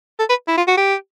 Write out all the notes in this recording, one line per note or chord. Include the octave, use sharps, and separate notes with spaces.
A4
B4
E4
F4
F#4
G4